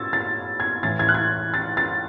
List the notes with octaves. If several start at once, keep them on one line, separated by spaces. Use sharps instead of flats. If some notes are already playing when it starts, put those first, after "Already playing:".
Already playing: B2 E6 G#6 A6
A6
G#6
A2 E3 A6
G#6
F#6
G#6
A6
A6